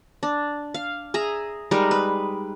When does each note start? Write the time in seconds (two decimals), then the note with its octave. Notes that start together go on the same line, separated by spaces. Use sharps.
0.23 D4
0.74 F5
1.14 G#4 E5 A#5
1.71 G3 G#3 D#4 A#4
1.91 B4